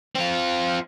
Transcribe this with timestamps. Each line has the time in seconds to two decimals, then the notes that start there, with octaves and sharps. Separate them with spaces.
0.15 C4 F4